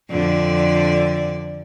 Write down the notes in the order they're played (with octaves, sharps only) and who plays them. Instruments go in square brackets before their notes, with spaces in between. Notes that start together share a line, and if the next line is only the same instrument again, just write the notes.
[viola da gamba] F2 D3 D5